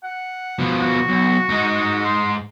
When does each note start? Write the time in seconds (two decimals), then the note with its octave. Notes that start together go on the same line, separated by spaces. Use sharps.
0.04 F#5
0.59 B2 F3
0.80 F#4
1.09 B1
1.50 G#2 D#4
2.04 C6